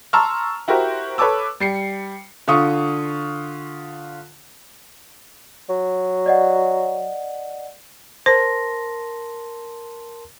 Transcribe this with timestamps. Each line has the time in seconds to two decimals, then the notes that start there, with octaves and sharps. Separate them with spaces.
0.13 A5 A#5 C6 C#6 E6 F6
0.68 E4 F#4 G4 A#4 C5
1.18 A4 B4 C#5 A5 D6 E6
1.60 G3 C7 C#7
2.48 D3 F4 C#6 D#6
5.69 F#3
6.26 D5 D#5 F#5
8.26 A#4 C5 A5 C6 A#6